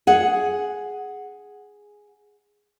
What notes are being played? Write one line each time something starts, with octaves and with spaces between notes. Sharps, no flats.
G#4 F#5